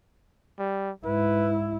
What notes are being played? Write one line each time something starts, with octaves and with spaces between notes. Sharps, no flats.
G3
G#2 E4 B4